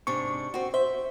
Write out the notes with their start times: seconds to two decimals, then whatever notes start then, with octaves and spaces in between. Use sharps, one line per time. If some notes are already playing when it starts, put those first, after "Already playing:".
0.07 G#2 C3 D4 C#6
0.54 C4 F#4
0.74 C5 E5